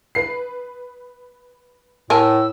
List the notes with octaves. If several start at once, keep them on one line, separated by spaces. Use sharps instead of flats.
B4 C7
A2 A#4 G#5 A5 E6